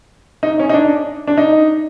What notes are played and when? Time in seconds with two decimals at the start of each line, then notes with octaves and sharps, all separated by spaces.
0.43 D#4
0.59 C#4
0.69 D#4
0.74 D4
1.27 D4
1.37 D#4